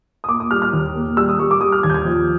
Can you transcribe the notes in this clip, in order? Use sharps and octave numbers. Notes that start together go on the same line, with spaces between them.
D#6
A#3 D6
D#6
G3 F6
F6
D#2
A#3
G3 E6
D#6
G3 C#6
D6
G3 D#6
F6
D#2 G#6
G6
G#6
F3